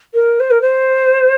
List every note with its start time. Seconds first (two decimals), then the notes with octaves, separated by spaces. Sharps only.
0.13 A#4
0.39 C5
0.50 A#4
0.61 C5